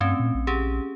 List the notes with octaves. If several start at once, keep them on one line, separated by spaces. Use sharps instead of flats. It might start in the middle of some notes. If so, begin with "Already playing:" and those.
G2 A3 C4 C#4
A#2
A#1
C#4 G4 G#4